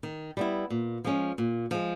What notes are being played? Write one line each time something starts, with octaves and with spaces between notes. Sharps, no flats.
D#3
G3 B3 E4
A#2
F3 G#3 C#4
A#2
F3 G#3